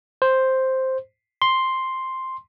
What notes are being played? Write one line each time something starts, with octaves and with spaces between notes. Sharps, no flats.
C5
C6